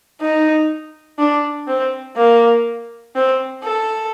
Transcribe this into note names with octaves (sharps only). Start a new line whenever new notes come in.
D#4
D4
C4
A#3
C4
A4